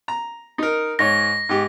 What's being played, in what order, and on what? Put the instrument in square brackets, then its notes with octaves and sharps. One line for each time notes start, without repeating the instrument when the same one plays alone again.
[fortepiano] A#5
D#4 A#4
[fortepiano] G#2 C#5 [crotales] A#6
[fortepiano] G#2 G4